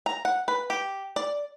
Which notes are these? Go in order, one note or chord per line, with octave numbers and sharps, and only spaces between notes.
A#5
F#5
B4
G4
D5